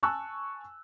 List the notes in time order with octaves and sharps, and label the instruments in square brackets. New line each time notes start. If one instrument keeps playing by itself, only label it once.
[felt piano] G#5 A5 C#6 E6 F#6